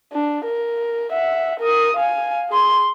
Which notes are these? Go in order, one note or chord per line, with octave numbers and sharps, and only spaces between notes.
D4
A#4
E5 F#5
A#4 D#6
F5 G#5
G#4 C6